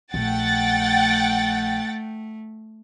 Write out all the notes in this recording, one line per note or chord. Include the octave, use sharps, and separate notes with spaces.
A#1 A3 F#5 G5 A6